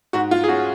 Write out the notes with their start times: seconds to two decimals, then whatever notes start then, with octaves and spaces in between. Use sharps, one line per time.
0.13 G#2 F#4
0.31 F4
0.44 G#4
0.48 C#4 F#4